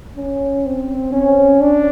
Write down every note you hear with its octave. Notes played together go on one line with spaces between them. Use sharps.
C#4
C4
C#4
D4